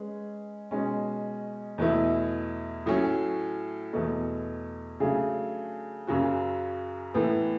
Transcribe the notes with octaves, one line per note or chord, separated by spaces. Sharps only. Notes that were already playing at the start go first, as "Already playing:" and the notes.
Already playing: G#3 C#4 G#4 B4
B2 G#3 C#4
E2 B2 A3 E4
A2 F#3 A3 C#4
E2 B2 A3
C#3 F#3 A3 D4 G#4
F#2 C#3 F#3 C#4 F#4
A2 E3 B3